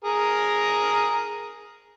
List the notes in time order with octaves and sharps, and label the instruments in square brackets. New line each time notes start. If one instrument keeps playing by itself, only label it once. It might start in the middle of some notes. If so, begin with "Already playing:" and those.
[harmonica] G#4 A#4